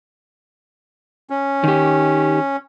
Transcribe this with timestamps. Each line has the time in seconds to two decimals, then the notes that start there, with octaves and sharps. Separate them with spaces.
1.30 C#4
1.64 D#3 G4